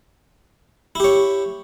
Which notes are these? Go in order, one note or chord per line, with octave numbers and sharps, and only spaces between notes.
E4 G4 C#5